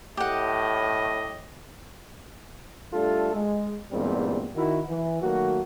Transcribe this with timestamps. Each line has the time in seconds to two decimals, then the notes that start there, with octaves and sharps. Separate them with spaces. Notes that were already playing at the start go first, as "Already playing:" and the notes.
0.17 A2 G4 D#5 F#5
2.93 G3 A3 D4 F4 A4
3.33 G#3
3.91 E2 G2 A#2 G3 G#3 C4
4.55 D#3 E4 F#4
4.89 E3
5.22 D#3 F#3 A3 A#3 F#4